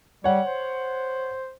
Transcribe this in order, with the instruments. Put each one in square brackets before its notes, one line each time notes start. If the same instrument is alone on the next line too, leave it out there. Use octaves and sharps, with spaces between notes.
[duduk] G3 [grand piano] C#5 F#5
[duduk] C5